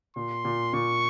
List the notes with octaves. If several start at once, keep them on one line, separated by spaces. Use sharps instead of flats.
A#2 C6
A#2
A#2 C#6